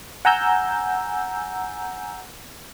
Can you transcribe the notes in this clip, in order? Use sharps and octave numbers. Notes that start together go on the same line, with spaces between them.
F#5 G#5 A#5 E6 G6